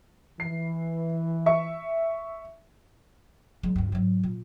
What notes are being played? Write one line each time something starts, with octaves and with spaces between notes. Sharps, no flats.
E3 C7
E5 C#6
F#3 G#3
D2 G2
G#2 F#3
A#2